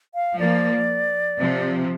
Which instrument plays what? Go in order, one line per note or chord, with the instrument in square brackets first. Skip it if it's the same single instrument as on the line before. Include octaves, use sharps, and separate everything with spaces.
[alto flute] F5
[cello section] F3 A#3 [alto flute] D5
[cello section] C3 F3